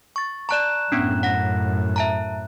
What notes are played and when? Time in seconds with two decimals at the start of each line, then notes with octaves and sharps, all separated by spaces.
0.16 C#6 A6
0.49 D5 A5 A#5 C#6 F#6 E7
0.92 F#2 A2 B3 C#4 D4
1.23 F#5 A#6
1.96 E5 A5 A#5